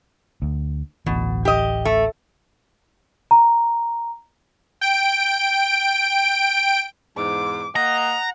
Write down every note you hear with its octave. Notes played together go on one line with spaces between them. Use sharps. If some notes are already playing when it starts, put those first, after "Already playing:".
D2
D1 A1 B2 E3
G4 D#5
A3
A#5
G5 D7
E2 G#2 D6
A#3 D#5 F#5 A#5